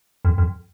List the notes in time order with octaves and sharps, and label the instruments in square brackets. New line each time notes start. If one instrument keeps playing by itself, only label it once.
[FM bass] F2
F2